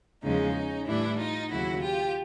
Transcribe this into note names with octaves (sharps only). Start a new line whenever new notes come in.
E2 C#3 F3 G#3 C#4 D#4
A2 E3 G3 D4 E4
D#4 F4
D#2 C#3 F#3 E4 F#4
F4 G4